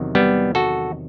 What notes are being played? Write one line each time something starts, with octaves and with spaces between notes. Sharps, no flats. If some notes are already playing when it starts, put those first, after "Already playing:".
Already playing: E2 C3 D#3 F#3
G3 B3
F#4 A4